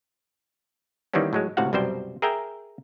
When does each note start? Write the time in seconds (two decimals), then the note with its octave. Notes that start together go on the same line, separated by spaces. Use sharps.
1.14 D#3 E3 G3 A#3 B3 C#4
1.33 A2 F#3 G#3
1.57 C#2 A2 C3 F#4 F5 F#5
1.73 C2 F#2 B2 G3 C5 G5
2.22 G#4 A#4 E5 G5 G#5 A#5